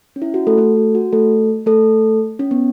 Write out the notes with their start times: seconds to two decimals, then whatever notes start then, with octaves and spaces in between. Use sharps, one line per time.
0.16 C#4
0.22 E4
0.34 F#4
0.47 A3 A4
0.58 A3 A4
0.76 F#4
0.95 F#4
1.12 A3 A4
1.66 A3 A4
2.39 C#4
2.51 B3